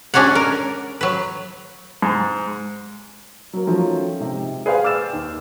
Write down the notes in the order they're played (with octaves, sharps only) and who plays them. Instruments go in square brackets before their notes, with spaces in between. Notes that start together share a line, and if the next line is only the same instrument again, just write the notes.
[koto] G#3 C#4 D4 F#4 C#5 F#5
A#4
F#3 B4
[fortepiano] G#2
[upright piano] F#3 A#3
D#3 F3 F#3 A3 C#4
G#2 C3
G#4 B4 C5 D5 F5 G5
D6 E6 F6 G6 A6 E7
D#2